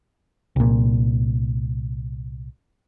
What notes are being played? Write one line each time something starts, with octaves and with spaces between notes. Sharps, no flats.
C2 A#2